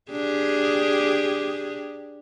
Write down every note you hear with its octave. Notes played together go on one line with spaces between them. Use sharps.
D4 G4 G#4